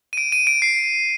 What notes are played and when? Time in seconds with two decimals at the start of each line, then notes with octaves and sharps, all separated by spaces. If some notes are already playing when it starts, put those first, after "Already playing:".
0.13 D#7
0.17 D7
0.32 D#7
0.47 D7
0.62 C7